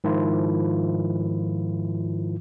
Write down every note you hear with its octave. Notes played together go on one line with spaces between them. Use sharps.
G#2 D#3 F3 E4 F4